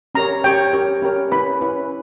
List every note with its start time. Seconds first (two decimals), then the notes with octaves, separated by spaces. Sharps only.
0.15 C#4 G4 A#4 C#5 A#5
0.44 C#4 G4 A#4 C#5 G5
0.73 C#4 G4 A#4 C#5
1.02 C#4 G4 A#4 C#5
1.31 C#4 E4 B4 B5
1.61 C#4 E4 B4